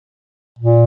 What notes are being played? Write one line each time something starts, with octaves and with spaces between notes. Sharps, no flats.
A#2